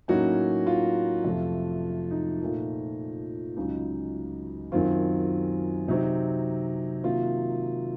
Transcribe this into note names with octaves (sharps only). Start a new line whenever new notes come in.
A2 F#3 A#3 C#4 D#4 F#4
F4
F2 C3 F3 A3
D#4
A#2 F3 A3
C#2 C#3 F#3 D#4
F#2 D#3 F#3 C4 F4
C3 F#3 C4 D#4
C3 D#3 F#3 A#3 F4